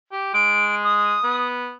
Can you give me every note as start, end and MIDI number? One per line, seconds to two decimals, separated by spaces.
0.12 0.33 67
0.34 1.17 56
0.34 0.75 98
0.84 1.47 87
1.24 1.73 59